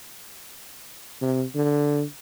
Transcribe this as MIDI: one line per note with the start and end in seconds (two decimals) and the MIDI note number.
1.21 1.44 48
1.55 2.03 50